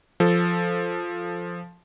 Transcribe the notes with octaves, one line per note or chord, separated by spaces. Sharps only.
F3 A4